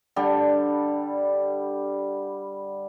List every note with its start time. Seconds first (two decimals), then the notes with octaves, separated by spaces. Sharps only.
0.16 D3 G3